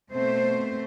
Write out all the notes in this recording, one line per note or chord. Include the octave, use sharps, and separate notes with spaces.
B2 A3 C4 C5